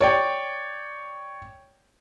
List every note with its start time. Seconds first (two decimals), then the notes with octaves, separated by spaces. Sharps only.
0.01 C#5 D5 G5